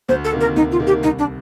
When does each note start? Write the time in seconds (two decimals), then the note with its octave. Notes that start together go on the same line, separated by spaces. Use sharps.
0.09 D2 C5
0.25 A4
0.32 C3 D#3 A#3
0.41 A#4
0.56 D2 D#4
0.72 F4
0.79 C3 D#3 A#3
0.87 G4
1.03 C2 D#4
1.19 D4